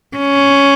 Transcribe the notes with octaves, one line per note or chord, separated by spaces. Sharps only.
C#4